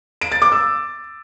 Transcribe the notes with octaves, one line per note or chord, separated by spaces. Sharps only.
D7
A6
D6
E6